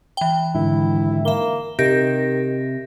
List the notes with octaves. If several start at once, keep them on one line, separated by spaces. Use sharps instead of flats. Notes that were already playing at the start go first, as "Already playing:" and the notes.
E3 G5
G#2 D3 D#3 E4
A#3 E5 G7
C3 D#3 G4 E5 A#6